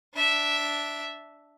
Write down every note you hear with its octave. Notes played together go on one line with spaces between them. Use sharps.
D4 E5